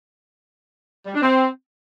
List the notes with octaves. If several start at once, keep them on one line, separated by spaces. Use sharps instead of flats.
G3
D4
C4